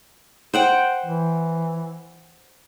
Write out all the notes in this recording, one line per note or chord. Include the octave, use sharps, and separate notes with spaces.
C5 F#5 G5
E3